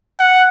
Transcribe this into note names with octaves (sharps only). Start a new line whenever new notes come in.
F#5